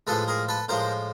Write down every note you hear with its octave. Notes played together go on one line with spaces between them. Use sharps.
A2 F3 G#3 A4 B4
G#4 A#4
A4 B4
A2 F3 G#3 A#4 C5